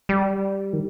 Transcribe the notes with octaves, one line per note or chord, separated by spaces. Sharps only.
G3
D#3